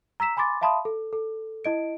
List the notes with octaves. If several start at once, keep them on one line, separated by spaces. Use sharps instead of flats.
A#5 E6 B6 E7
G#5 B5 C6 D6 A6
E5 F5 A5 B5 C6 D#6
A4
A4
E4 D#5 D7